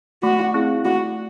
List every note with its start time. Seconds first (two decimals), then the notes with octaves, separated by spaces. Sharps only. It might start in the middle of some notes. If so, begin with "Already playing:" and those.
0.23 A3 F#4
0.54 C4 E4 G#4
0.85 A3 F#4